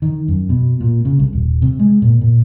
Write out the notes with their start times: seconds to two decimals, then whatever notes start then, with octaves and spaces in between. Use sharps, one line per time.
0.02 D#3
0.28 F#2
0.49 B2
0.80 A#2
1.05 C#3
1.19 C2
1.33 D#1
1.62 C3
1.79 G#3
2.02 A#2
2.21 A#2